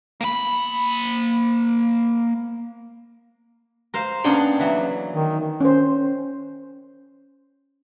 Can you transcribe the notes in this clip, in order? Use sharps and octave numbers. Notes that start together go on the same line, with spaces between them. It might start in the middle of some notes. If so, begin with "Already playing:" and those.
A#3 B5
A#4 C5 F5
A#3 B3 C#4 D4 G#4 G5
E3 F#3
D#3
C#4 C5